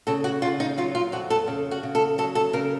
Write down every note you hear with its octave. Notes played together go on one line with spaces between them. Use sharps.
C#3 A4
F#4
C#3 F4
D#4
F#3 F4
F4
F2 F#4
A4
C#3
F#4
C#3
A4
F#3 A4
A4
C#3 A#4